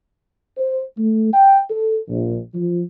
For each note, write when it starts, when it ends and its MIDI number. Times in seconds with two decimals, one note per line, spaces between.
0.57 0.82 72
0.97 1.33 57
1.33 1.58 79
1.69 1.98 69
2.09 2.36 34
2.53 2.81 53